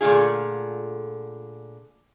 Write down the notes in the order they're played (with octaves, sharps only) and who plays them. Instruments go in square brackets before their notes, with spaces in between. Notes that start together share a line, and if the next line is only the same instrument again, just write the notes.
[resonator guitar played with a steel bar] A#2 D3 A3 F4 G#4